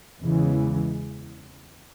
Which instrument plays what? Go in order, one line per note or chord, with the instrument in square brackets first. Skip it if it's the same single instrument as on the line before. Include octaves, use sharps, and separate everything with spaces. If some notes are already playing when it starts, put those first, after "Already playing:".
[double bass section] E2 C#3 E3 G#3